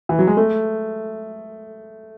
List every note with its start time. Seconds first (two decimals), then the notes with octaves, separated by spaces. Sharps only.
0.09 E3
0.19 F#3
0.27 G#3
0.37 A3